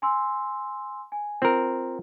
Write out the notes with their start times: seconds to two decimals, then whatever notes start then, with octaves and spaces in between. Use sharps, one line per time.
0.02 G#5 C6 E6
1.12 G#5
1.42 C4 F4 A#4